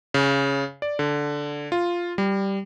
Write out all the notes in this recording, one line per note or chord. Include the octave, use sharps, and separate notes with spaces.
C#3
D5
D3
F4
G3